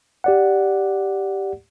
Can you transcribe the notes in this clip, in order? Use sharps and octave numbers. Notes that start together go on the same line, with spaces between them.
G4 D5 F#5